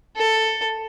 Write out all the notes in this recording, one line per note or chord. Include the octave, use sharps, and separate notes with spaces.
A4